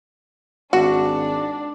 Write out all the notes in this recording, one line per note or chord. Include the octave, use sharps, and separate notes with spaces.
G#1 D4 F#4